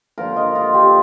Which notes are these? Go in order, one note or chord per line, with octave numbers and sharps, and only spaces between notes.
D3 F3 A#3 F4 A#4
D#5
F4
G4